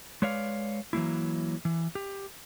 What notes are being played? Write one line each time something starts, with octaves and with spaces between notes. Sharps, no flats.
G#3 B4 C#5 D5 F5
E3 F#3 A#3 E4
E3
G4